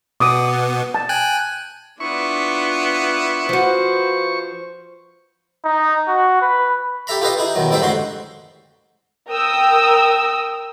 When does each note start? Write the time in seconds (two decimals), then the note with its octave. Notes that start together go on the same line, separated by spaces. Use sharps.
0.20 B2 B3 D6 D#6
0.94 A5
1.09 G5 G#5 F#6
2.00 B3 D4 E4 F4 C#6
3.49 F3 F#4 B4 C5
5.64 D#4
6.08 F#4
6.42 B4
7.07 G4 A4 E5 A#5 B5
7.21 F4 G4 A4 B4 D#5 F5
7.38 D#4 E4 G#4
7.55 E2 B2 D#3 F#3
7.71 A2 G3 C4 D#4 C5 E5
7.82 A1 F2 D3 G#3 F#4 C6
9.29 A#4 G5 D#6 E6